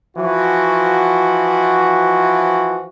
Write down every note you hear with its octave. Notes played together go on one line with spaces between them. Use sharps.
E3 F3 F#4